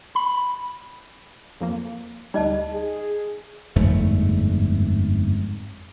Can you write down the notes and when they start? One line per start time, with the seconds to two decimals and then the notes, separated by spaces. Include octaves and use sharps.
0.15 B5
1.61 F2 F3 A#3
2.34 D2 G3 D#4 D#5 A5
2.73 G#4
3.76 G1 F2 G#2 A3